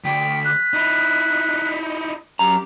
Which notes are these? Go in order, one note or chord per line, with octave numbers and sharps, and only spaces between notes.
D2 D3 G5 B6
F#6
D#4 E4
F#2 G4 A#5